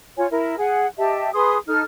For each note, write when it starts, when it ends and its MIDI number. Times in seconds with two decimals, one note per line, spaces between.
0.17 0.27 65
0.17 0.27 73
0.17 0.27 80
0.31 0.58 64
0.31 0.58 70
0.58 0.86 68
0.58 0.86 78
0.58 0.86 80
0.98 1.30 67
0.98 1.30 75
0.98 1.30 76
0.98 1.30 81
1.33 1.56 68
1.33 1.56 71
1.33 1.56 84
1.33 1.56 87
1.67 1.83 63
1.67 1.83 69
1.67 1.83 89